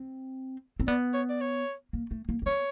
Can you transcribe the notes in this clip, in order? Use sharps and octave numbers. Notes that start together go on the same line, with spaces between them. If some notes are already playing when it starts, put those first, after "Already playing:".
Already playing: C4
C4
B3 D5
C#5
D5
C#5
A#3
A3
A#3
A#3
B3 C#5